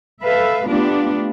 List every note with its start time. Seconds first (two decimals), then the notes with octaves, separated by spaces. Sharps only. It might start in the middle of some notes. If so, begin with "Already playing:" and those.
0.22 A4 B4 E5 F5
0.68 A3 B3 D4 F4 G4